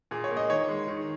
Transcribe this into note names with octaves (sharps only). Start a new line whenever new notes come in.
A#2 G#4
C#5
A#3
D#5
D#3 C#5
G#3
D#3